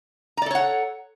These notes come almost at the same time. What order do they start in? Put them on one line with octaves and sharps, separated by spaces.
A#5 D5 A4 C#5 F#5